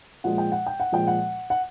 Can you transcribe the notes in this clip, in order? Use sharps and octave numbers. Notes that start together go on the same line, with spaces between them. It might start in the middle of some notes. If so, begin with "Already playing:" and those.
A#2 F3 G#3 F#5
G5
F#5
G5
F#5
A#2 F3 G#3 G5
F#5
F#5